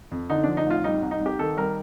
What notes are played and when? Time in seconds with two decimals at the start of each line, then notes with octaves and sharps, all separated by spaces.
0.11 F2
0.30 D3 D#4
0.43 F3 D4
0.57 D#4
0.66 A1 F4
0.84 G3 D#4
1.02 C2
1.11 D#4
1.21 C2 G4
1.39 D#3 A4
1.57 G3 A#4